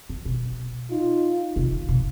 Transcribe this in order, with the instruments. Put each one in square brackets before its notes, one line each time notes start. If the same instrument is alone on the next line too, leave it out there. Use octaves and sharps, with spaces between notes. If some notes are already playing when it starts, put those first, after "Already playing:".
[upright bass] D#3
B2
[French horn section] D#4 F4
[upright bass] C3
C#3
B2